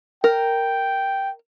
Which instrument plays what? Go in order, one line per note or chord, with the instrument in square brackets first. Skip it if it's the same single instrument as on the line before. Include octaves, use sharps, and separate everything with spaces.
[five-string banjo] A#4 [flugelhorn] G5